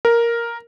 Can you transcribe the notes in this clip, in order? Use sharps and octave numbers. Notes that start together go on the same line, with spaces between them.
A#4